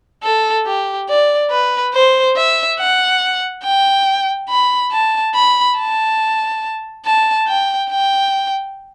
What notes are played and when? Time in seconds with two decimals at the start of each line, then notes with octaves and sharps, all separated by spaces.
0.23 A4
0.66 G4
1.08 D5
1.50 B4
1.93 C5
2.36 E5
2.79 F#5
3.63 G5
4.49 B5
4.91 A5
5.34 B5
5.77 A5
7.05 A5
7.47 G5
7.90 G5